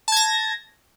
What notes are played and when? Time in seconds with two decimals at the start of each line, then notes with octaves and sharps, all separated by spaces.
0.08 A5
0.12 G#6
0.17 A#6